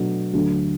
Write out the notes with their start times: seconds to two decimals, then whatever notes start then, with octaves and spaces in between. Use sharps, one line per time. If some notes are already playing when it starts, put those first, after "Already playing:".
Already playing: B2 F#3 A3 D4 F#4
0.33 D2 D3 F#3